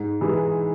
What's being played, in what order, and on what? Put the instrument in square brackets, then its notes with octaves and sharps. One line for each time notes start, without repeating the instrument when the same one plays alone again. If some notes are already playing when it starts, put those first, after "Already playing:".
Already playing: [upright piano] G#2
E3 G#3